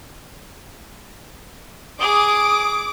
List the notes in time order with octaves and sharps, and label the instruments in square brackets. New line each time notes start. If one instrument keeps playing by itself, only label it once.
[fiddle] G#4 [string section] D6 [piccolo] D#6